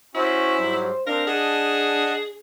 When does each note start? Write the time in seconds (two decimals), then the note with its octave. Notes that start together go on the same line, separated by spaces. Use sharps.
0.15 C#4 E4 F#4 C5
0.58 G#2 F#3 G3
1.07 C4 D4 A#4 F5
1.27 G#4 D#5 F#5 A5